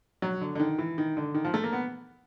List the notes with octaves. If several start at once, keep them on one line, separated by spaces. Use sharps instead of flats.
F#3
D3
D3
D#3
E3
D#3
D3
D#3
F3
A3
A#3
B3